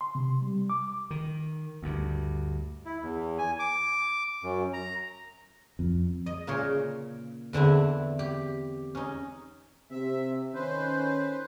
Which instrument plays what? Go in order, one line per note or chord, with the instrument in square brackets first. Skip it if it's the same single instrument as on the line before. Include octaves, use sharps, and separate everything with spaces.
[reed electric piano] C6
C3
G3
D6
[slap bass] D#3
D2 G2
[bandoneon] E4
E2
G#5
D6
F#2
A#5
[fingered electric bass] F2
[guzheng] D#5
A#2 C#3 A#4 C#5 C6
E2 D3 C4 E4
G4
C#4 D#4
[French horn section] C3 C4 [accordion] E5
[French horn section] D#3 C#4 [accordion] B4 C5